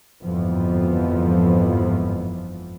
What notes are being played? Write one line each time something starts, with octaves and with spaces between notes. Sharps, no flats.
G1 F2 G#2 E3 F3 B3